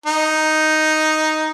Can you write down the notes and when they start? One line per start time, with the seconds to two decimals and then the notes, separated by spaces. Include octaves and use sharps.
0.06 D#4